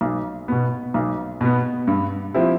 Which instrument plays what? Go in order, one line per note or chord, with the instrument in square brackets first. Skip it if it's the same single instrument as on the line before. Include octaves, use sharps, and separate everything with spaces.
[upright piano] B1
B2 B3
B1
B2 B3
G2
F3 C4 E4 G4